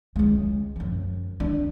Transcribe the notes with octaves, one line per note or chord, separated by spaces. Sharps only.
C#2 G#3
F#2 F3
D4